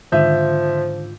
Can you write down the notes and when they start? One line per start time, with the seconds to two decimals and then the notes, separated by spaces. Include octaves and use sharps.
0.12 G#2 D3 D#3 F3 F4 E5 G6